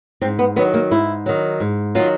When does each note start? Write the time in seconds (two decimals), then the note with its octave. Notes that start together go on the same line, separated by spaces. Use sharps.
0.21 G#2 C4
0.39 B3
0.56 D#3 F#3 B3
0.74 A#3
0.91 G#2 E4
1.26 D#3 F#3
1.60 G#2
1.95 D#3 F#3 F4